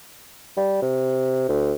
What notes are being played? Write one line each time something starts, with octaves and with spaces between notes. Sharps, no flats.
G3
C3
D2